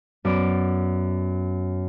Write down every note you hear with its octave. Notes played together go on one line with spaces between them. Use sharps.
F#2 B3 D5 D7